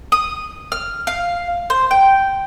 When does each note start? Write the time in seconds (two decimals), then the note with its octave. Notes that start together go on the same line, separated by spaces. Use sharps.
0.12 D#6
0.72 F6
1.07 F5
1.70 C5
1.91 G5